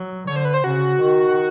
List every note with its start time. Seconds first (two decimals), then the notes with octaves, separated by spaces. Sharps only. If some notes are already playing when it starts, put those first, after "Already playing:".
Already playing: F#3
0.27 D3 C#5
0.36 C5
0.45 B4
0.54 C5
0.64 C#3 F#4
1.01 D#3